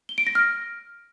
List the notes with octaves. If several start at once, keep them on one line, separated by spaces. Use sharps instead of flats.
G7
D7
A#6
F6